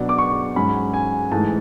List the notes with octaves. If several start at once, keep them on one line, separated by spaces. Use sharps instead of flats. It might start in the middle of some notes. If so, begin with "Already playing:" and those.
Already playing: B2 F#3 B3 D4
D6
C#6
G#2 F#3 C#4 B5
G#5
G#2 E3 A3 A5